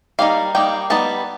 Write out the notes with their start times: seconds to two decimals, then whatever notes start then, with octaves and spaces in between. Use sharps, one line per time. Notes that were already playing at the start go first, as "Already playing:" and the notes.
0.19 G3 A#3 D#4 F5
0.55 G3 A#3 D#4 G5
0.90 G3 B3 D#4 A5